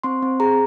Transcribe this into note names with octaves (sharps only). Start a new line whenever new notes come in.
C4 C6
C4
G#4 A#5